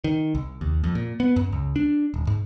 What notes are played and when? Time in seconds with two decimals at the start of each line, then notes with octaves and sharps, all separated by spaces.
0.04 D#3
0.35 C2
0.61 D#2
0.84 F2
0.95 A#2
1.20 B3
1.36 F#2
1.52 C#2
1.76 D4
2.14 D#1
2.27 G#2